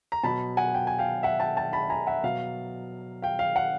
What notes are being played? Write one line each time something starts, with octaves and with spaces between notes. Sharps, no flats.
A#5
B2 F#3 A5 B5
F#5 G#5
G5
G#5
F5 G5
E5 F#5
G5 A5
G5 A5
A5 B5
G#5 A#5
E5 F#5
B2 F#3 F5
F5 G5
F5
F#5